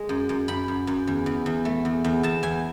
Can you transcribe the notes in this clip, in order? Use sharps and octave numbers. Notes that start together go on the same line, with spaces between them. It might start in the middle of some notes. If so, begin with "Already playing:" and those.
Already playing: G#3
F#2
F#2
F#2 B5
F#2
F#2
E2
E2
E2
A3
E2
E2
E2 A5
E2 G#5